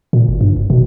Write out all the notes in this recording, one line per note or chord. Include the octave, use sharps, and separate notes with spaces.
A#2
G1
G2
F#1
B2